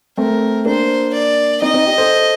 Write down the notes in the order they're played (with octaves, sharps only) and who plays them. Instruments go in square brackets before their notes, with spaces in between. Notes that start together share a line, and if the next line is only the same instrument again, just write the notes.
[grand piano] A3 C4 [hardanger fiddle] A#4
[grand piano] A#3 D4 [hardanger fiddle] C5
[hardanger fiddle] D5
[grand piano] C4 D#4 [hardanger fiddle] D#5
[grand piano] C4 D#4
D#4 G4
A4 C5